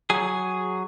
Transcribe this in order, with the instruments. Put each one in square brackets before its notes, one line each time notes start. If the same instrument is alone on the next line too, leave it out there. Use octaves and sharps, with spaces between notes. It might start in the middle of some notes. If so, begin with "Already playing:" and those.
[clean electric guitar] F#3 G#4